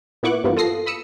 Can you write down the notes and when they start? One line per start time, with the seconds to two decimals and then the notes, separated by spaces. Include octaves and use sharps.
0.23 A#2 B3 E4 C#6 D6 F#6
0.44 G2 E3 F3 A#3 B3 F4
0.57 F4 A4 D#6 A#6 C7
0.86 B5 D#6 E6 C#7